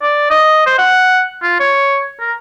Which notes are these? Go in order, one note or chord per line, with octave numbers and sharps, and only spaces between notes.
D5
D#5
C5
F#5
F4
C#5
A#4